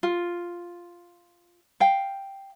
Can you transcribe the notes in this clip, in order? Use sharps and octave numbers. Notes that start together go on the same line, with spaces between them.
F4
F5 G5